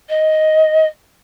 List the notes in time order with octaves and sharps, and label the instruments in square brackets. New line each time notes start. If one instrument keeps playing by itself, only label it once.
[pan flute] D#5